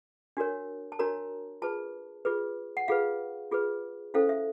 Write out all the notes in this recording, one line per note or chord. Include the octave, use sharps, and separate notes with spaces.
D4 F#4 A#4 C#5
A5
D4 F#4 A#4 C#5 A#5
F4 G#4 B4 A5
F4 G#4 B4
F#5
F4 G#4 B4 F5
F4 G#4 B4
C#4 E4 A4 C5 F5
E5